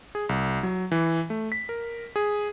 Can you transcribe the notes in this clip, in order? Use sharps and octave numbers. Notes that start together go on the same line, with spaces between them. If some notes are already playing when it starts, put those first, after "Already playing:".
G#4
C2
F#3
E3
A3
B6
A#4
G#4